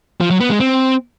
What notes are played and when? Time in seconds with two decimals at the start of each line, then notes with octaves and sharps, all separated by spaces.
0.21 F3
0.30 F#3
0.40 B3
0.50 G#3
0.60 C4